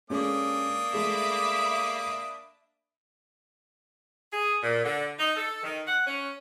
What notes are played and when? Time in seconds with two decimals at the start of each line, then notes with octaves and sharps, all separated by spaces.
0.10 G#3 A#3 C#4 D4 A4 D#6
0.93 G#3 A3 G#4 E5 B5 D6
4.32 G#4
4.63 A#2
4.84 D3
5.19 D#4
5.36 A4
5.63 D#3
5.87 F#5
6.07 C#4